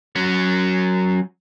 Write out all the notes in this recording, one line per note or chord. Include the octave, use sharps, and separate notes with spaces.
F#3 C#4